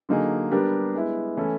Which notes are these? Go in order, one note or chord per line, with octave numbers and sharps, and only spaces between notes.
D3 F#3 A#3 D#4 G#4
G3 B3 D4 G4 A#4
G#3 B3 E4
E3 A3 C#4 E4 A4